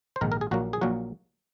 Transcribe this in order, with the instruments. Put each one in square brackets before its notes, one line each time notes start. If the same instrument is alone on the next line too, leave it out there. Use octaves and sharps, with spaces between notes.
[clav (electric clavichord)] C5
A#1 G#2 D#3 A#4
A#4
G#4
A#1 A#2 F#3 A#3 F#4
G#4
A#1 A#2 F#3 A#3 F#4